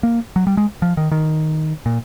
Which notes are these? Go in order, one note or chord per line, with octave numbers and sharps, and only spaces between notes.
A#3
F#3
G3
G#3
F3
D#3
D#3
A#2